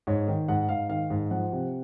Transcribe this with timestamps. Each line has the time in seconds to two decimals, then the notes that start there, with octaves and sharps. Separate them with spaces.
0.07 G#2 C#5
0.28 D#3
0.48 G#2 F#5
0.69 G#2 F5
0.89 D#3 F5
1.10 G#2
1.31 F3 F#5
1.52 C3